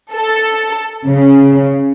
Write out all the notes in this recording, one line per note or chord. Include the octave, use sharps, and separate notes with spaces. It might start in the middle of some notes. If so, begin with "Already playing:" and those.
A4
C#3